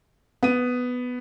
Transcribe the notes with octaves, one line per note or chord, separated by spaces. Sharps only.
B3 D#7